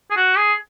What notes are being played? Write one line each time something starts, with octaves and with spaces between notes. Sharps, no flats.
G#4
F#4
G#4